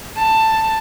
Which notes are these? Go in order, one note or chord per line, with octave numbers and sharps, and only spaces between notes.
A5